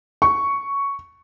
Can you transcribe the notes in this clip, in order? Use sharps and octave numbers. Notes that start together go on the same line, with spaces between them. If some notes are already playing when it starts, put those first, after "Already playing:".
C#6